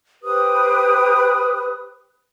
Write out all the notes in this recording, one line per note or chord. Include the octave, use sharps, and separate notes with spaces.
G4 B4 C5 D#6